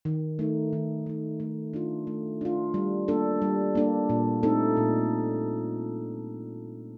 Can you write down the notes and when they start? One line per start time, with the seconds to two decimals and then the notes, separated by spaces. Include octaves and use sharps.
0.05 D#3
0.39 A3 D#4
0.73 D#3
1.06 A3 D#4
1.40 A3
1.73 D4 F4
2.07 A3
2.41 D4 F4
2.74 G3
3.08 A#3 D4 A4
3.42 G3
3.75 A#3 D4 A4
4.09 A#2
4.43 A3 C4 D#4 A4
4.77 A#2